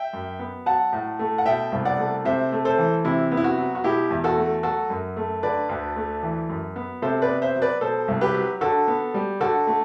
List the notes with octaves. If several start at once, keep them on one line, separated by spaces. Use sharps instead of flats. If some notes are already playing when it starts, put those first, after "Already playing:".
Already playing: E5 G5
F#2
B3
F#3 F#5 A5
A2
A3
F#5
B2 E5 G5
C2
D5 F#5
A3
C3 C5 E5
A3
A4 C5
E3
C3 E4
B3
E4
F#4
F#3
F#4
B2 E4 G4
E2
F#4 A4
A3
F#3 F#4 A4
F#2
A3
D3 B4 D5
D2
A3
E3
F#2
B3
C3 A4 C5
B4 D5
B3
C5 E5
F#3
B4 D5
B2 A4 C5
C2
G4 B4
F#3
D3 F#4 A4
B3
G3
D3 F#4 A4
A3